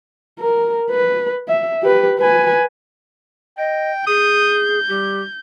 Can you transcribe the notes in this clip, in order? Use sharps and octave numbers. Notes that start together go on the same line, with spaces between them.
A#4
B4
E5
G4 B4
B4 G#5
D#5 G5
G#4 D#6 G6
G3 G4